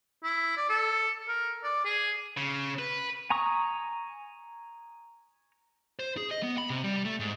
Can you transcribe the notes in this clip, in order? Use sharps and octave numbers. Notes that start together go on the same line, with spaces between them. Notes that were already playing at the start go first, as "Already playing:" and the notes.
E4
D5
A4
A#4
D5
G#4
C#3
B4
G#5 A#5 C#6 D#6
C5
G#4
D#5
B3
B5
C3
G3
A3
G#2